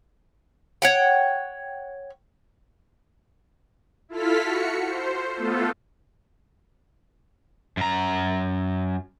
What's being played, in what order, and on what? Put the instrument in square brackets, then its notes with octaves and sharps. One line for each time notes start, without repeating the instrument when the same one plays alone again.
[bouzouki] C#5 F#5 G5
[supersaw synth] E4 F4 A4 F6 B6
F#4 C#7
C5
A3 B3 F4 A4
[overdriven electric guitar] F#2 A#5